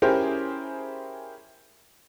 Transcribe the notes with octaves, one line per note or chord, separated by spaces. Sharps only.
C#4 E4 G4 G#4 A#4 C5